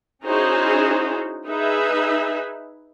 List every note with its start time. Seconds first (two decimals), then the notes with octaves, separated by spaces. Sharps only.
0.24 C#4 D#4 E4 F#4 G#4 C5
1.47 D#4 G#4 B4 E5